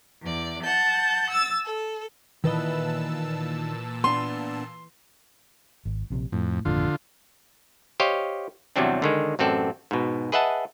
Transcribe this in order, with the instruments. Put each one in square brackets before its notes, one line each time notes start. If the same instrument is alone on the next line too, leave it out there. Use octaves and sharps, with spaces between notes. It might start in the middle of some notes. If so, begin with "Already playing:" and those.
[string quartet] E2 D5
F#5 A5 G6
E6 A6
A4
[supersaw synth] A#2 A5 E6 [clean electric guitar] D#3 D#5 [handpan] E3 B4
[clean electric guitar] B3 D4 [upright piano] C6
[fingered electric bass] G#1
A#1 C3
[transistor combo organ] F2 [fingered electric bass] A2
[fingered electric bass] G#1 F2 A#2 [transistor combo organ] D3 F4
[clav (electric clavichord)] G4 C5 C#5 D#5 F5
E2 C3 F#3 G3 C4 D4
D3 D#3 G#3
A1 F#2 C4 A4 D5
G#2 B2
G#4 B4 D#5 E5 F#5 A5